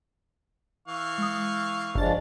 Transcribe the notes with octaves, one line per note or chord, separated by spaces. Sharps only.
E3 F5 C#6
G#3 D#6
G1 F3 G#3 D4 A6